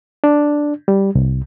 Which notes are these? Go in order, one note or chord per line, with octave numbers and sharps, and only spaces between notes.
D4
G3
C2